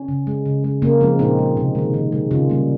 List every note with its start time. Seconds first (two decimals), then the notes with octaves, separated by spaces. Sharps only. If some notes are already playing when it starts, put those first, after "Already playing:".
Already playing: C#4
0.08 C#3
0.27 G#3
0.46 C#3
0.64 G#3
0.82 C#3 A#3 C#4
1.01 F3 G#3 C4
1.19 A#2 C4 D#4
1.39 G#3
1.57 C3
1.75 D#3 G#3
1.94 D#3
2.12 G#3
2.31 C#3 C#4 F4
2.50 G3 A#3